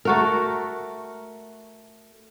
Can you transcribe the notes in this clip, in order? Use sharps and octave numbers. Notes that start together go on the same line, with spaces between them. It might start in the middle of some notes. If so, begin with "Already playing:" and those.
A3 F#4 A#4